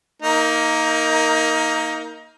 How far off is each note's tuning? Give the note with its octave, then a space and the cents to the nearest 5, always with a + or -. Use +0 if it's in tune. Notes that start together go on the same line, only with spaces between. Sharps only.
A#3 +0 D#4 +25 A#4 +0